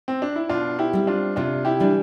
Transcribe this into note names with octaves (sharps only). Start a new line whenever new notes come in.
C4
D4
E4
B2 D4 F4
E4 G4
G3 C4
D4 F4
C3 D4 F4
E4 G4
E3 G3 D4